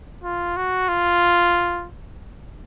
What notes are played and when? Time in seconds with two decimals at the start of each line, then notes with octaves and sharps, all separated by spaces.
0.24 F4
0.57 F#4
0.89 F4